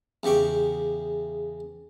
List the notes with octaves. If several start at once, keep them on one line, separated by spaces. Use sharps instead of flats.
E2 C#3 G4 C#6 D6